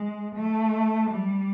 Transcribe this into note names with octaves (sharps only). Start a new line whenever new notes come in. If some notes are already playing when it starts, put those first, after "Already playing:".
Already playing: G#3
A3
G3